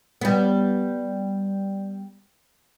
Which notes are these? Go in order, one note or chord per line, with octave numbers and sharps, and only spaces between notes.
G3 B3